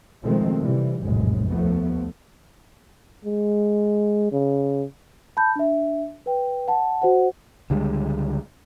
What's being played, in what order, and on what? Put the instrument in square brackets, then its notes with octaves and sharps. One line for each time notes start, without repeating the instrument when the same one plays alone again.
[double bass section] B2 D#3 F3 G#3 A3 C4
C3 E3 G3
F1 A#1 F#2 A2 G#3
D#2 F3 A3 B3
[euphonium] G#3
C#3
[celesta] A5 B5 G6
D4 E5
B4 G5
F#5 A5
F#4 C5 F#5
[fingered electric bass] C#2 D3 G3 G#3